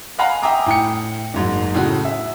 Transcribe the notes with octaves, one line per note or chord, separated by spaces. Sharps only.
D#5 F5 F#5 G#5 A#5 B5
E5 G5 G#5 A#5 D6 D#6
A2 G5 C#7
F#1 G#2 F#3
A2 C#3 A3 F#4
E5